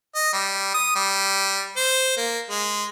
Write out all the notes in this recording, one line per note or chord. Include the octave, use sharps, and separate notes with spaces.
D#5
G3
D#6
G3
C5
A#3
G#3